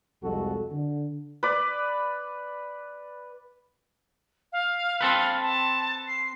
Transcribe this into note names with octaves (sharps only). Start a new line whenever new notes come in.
C2 F2 F3 G#3 F#4 A4
D3
B4 D5
F5
C4 A4 B4
A5
C7